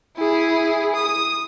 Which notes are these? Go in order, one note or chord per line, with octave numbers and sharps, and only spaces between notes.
E4 G#4
D#6